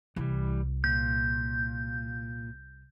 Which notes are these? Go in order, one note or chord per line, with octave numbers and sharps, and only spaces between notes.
C2 E3 G3
A#2 G6